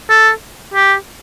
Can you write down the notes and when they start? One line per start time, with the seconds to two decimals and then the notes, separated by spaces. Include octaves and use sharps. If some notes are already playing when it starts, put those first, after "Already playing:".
0.10 A4
0.74 G4